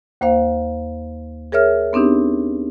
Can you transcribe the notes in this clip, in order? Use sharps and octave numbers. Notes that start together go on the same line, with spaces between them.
D#2 A#3 C5 F5
G#4 A#4 C#5 E5 F6
B3 C4 D4 D#4 G4